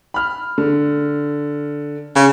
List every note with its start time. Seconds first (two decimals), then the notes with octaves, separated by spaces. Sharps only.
0.14 B5 F6
0.58 D3
2.16 C#3